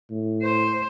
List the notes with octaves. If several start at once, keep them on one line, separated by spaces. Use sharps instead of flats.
A2
C5